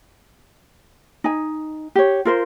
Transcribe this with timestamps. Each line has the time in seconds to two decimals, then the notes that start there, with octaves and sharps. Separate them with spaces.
1.24 D#4 G#5
1.95 G4 C#5
2.25 F4 A#4 C5